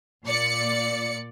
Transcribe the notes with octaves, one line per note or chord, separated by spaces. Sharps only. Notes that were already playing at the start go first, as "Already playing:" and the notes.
A#2 D5 C#7